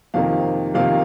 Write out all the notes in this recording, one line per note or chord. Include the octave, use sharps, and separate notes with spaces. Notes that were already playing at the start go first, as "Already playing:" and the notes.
F2 C3 D#3 A#3 F5
F2 C3 D#3 A#3 F5